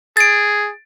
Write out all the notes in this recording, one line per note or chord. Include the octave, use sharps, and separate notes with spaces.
G#4 A6 D7